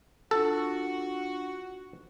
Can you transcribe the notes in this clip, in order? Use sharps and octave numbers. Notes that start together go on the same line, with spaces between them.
D4 F4 F#4 A4 C#6